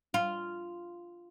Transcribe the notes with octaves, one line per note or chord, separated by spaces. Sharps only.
F4